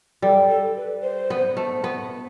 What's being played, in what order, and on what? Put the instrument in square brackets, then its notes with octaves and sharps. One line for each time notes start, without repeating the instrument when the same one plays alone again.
[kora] G3 [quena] A4
[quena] A4
B4
C5
[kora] B3
A3
B3